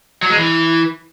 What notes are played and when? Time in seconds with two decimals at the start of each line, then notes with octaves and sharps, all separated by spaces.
0.23 F#3
0.30 G#3
0.37 E3